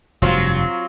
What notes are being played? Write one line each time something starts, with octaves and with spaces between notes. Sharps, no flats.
F1 G2 F#3 C4 F4